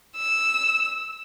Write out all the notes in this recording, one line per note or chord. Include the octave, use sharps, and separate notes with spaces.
E6